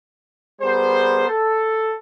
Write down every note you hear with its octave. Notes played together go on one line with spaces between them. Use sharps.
G3 B3 G#4 A#4 C5
A4